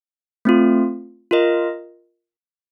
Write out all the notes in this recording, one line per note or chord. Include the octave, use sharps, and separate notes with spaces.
A3 C4 F4
F4 A#4 D#5